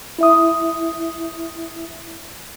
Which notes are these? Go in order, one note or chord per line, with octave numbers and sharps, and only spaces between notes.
E4 E5 D#6